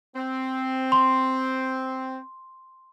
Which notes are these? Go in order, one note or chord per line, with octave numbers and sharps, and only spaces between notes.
C4
C6